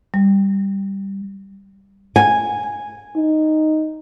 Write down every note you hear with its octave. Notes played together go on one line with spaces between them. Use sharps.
G3
G#5
D#4